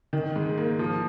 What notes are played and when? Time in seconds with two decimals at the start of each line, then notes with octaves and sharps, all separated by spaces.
0.13 D#3
0.36 G#2
0.58 A#3
0.79 F3